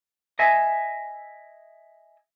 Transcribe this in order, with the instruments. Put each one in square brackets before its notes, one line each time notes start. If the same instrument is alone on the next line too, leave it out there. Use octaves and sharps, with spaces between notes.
[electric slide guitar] D#5 E5 G#5